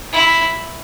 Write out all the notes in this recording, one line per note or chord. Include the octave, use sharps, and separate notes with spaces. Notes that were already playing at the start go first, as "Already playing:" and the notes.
E4